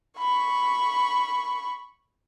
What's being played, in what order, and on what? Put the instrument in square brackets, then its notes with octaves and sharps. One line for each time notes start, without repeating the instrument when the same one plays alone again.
[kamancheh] B5 C#6